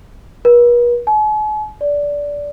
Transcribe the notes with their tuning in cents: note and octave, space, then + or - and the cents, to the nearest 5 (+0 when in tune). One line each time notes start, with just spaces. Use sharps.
B4 -45
G#5 +45
D5 -15